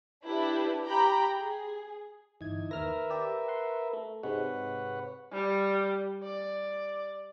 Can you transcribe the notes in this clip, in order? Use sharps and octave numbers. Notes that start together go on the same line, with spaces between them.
D4 E4 G4 B4
G4 G5 A#5 B5
G#4
G1 E3 D#4 G#6
D#2 A#4 B4 E5 F6 A#6
G4 D5 E6
F#5 C6
A3
G#2 C3 G#3 B4 C#5 F#5
G3
D5